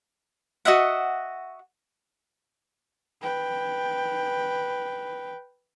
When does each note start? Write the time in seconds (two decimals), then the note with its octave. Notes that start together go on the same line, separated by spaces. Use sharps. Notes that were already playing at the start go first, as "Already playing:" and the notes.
0.65 F#4 D#5 E5 F#5
3.21 B4 G5